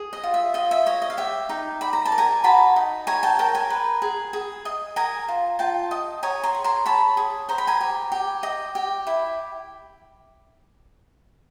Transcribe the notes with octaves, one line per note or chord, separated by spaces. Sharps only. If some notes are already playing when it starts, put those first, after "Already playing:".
Already playing: G#4
D#5
F4
E5
F4 D#5
E5
C#5 D#5
D#5
F5
G4 E5
D#4
D5 B5
A#5
A5
A#4
G#5 A#5
F#4 A5 B5
D#4
C#5 G#5 A#5
G5 A5
A#4 G5 A5
G#5 A#5
B4
G#4
G#4
D#5
A#4 G#5 A#5
F4
F4 G5 A5
D#5
C#5 G#5 A#5
A#5 C6
G#4
A#5 C6
C#5 A5 B5
G#4
C5 A#5
B5
G#5 A#5
G4
G4
D#5
G4
E4